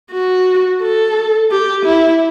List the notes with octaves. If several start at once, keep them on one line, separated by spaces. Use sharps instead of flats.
F#4
A4
G4
E4